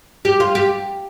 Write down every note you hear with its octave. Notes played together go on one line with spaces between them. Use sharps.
G4
F4
G4